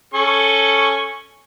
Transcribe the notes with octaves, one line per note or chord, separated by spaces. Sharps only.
C#4 A4 C#6